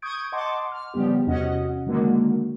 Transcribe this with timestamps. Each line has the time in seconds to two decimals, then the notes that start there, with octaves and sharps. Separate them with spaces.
0.02 C#6 D#6 G6 G#6 D7
0.32 D#5 F#5 A5 C6 D6
0.72 F6
0.94 C#3 F3 G3 B3 G4
1.27 E2 C3 C#4 F#4 D#5 F#5
1.86 D3 D#3 F#3 G#3 A#3 F#4